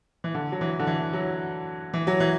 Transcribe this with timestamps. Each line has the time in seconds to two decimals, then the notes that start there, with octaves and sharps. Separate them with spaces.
0.24 E3
0.34 D3
0.52 F#3
0.61 E3
0.79 D3
0.87 E3
1.13 F#3
1.94 E3
2.07 F#3
2.20 E3